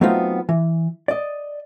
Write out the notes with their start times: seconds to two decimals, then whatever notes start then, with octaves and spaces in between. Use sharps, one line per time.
0.01 F#3 A3 B3 C4 D#4 F4
0.49 E3
1.08 D5 D#5